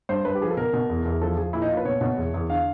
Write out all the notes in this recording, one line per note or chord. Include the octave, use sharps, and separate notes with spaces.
G2 C5
G2 B4
G4
F3 G#4
A4
B2 A#4
B2
E2
E2
F3 A4
F3 G#4
A#2 E4
D#4
A#2 F4
B4
B2 C#5
B2
E2
E2
D3 F5